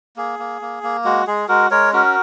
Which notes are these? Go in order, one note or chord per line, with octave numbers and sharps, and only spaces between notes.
A#3 G#4
A#3
A#3
A#3
G#3 F#4
G#3 G#4
G#3 F#4 A#4
G#3 A#4 C#5
C#4 F#4 A#4